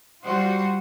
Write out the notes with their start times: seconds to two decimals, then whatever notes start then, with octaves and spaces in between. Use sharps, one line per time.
0.25 G3 F4 F#4 C5